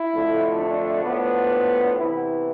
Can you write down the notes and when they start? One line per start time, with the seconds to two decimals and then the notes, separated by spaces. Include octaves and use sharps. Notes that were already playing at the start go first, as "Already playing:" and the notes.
Already playing: E4
0.13 F2 D3 F3 A3
0.60 D4
1.05 A2 F3 B3
1.97 C3 E3 B3 E4